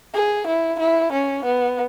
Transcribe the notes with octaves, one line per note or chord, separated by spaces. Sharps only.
G#4
E4
E4
C#4
B3